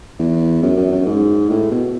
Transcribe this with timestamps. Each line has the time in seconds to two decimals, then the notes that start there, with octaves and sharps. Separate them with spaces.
0.19 E2
0.63 F#2
0.77 F#2
0.92 F#2
1.06 G#2
1.49 A2
1.71 B2